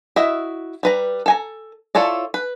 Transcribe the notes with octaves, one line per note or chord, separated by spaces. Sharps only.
E4 F#4 D#5 E5
G3 B4 A#5
A4 G#5 A#5
E4 F4 A4 C#5 D5
B4